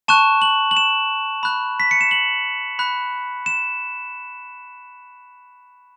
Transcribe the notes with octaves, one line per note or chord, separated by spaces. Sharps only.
A5 C#6 F#6 E7
F#7
F#7
E7
B5 F#6
B6
C#7
E7
F#7
B5 F#6
E7